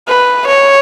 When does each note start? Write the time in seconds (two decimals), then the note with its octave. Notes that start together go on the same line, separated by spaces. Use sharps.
0.08 B4
0.47 C#5